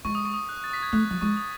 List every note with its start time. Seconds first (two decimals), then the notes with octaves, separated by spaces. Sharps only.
0.05 G#3 C#6
0.15 D#6
0.25 C#6
0.34 D#6
0.49 F#6
0.64 A6
0.73 B6
0.82 G#6
0.92 A3 F#6
1.11 F#3
1.21 G#3 C#6
1.37 D#6